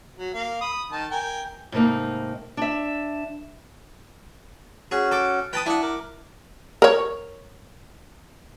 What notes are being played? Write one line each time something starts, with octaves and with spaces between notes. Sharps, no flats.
F#3
A#3 F5
B5 D#6
D#3 A5
A#4 G5 G#5
G#2 C3 A3 A#3 D#4
D4 E5
C#4 F#4 G#4
A4 D6
B4 G5 A5 B5 D#6
D4 E4 F#5
A#4 D6
A#4 C#5